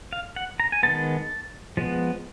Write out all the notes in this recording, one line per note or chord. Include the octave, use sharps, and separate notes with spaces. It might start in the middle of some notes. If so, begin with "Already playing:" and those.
F5
F#5
A#5
G#5
D#3 G#3 B3 A5
F3 G#3 B3